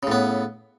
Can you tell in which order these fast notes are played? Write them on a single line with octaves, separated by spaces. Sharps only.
C#3 A2 B3